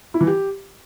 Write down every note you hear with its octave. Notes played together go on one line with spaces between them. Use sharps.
E4
E3
G4